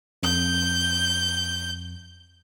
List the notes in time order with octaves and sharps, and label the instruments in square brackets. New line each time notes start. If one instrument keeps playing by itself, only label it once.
[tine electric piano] F2 [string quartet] G6